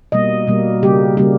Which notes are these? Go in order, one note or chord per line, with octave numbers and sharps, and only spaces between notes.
B2 G3 A#3 D#5
B2 G3 A#3
C#3 G3 A#3 G4
C#3 G3 A#3 G4